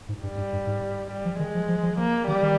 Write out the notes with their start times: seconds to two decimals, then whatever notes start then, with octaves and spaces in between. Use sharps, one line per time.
0.09 G#2
0.23 G2 G3
0.37 G2
0.53 G2
0.67 G#2
1.11 G3
1.25 F3
1.39 D#3 G#3
1.55 F3
1.69 F3
1.83 F3
1.97 F3 A#3
2.28 D#3 G3
2.42 D#3